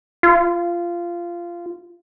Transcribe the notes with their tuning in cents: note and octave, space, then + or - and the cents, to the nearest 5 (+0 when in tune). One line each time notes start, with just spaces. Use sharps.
F4 -15